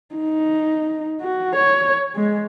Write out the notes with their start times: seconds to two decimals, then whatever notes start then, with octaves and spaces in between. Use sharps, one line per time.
0.15 D#4
1.22 F#4
1.57 C#5
2.16 G#3